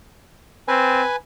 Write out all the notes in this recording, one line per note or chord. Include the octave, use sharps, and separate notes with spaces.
C4 B4 G#5